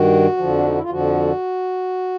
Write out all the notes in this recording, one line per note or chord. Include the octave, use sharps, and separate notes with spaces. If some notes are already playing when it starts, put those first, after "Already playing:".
Already playing: G2 D#3 F#4
F2 D3 F3
D4
D#4
E4
F4
F2 D3 F3 F#4